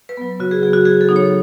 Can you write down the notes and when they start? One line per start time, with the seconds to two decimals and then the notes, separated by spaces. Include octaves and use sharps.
0.09 B4
0.17 F#3 B3
0.40 C#3 F#4
0.51 G#4
0.62 F#3 B3 G#4
0.73 F#4
0.85 C#3 G#4
1.01 A4
1.09 F#3 B3 D#4
1.16 C#5